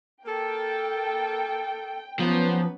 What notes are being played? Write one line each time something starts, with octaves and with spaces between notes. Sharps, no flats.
A#3 A4 G5
F3 F#3 B3 C#4 D#4 G4 B4